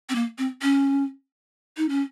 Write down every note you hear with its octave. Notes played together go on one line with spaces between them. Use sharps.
C4
A#3
C4
C#4
D#4
C#4